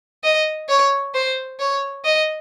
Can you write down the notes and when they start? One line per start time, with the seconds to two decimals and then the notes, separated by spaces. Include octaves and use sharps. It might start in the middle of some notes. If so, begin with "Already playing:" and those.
0.24 D#5
0.69 C#5
1.14 C5
1.59 C#5
2.05 D#5